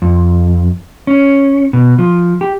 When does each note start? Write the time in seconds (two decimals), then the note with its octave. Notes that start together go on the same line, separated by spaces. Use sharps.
0.02 F2
1.07 C#4
1.73 B2
1.99 F3
2.41 G4